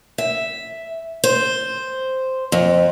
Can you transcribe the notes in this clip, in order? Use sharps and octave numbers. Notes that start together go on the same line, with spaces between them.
E5
C5
F2